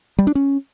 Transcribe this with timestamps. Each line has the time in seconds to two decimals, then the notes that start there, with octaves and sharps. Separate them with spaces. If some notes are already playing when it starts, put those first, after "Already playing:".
0.18 G3
0.27 D4
0.35 C#4